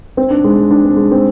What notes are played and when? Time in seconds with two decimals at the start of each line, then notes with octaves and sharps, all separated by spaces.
0.17 C4
0.30 D4
0.44 G#3
0.71 D4
0.85 C4
0.97 G#3
1.11 C4